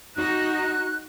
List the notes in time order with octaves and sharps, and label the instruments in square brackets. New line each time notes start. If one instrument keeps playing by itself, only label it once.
[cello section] D#4 F#4 [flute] F#6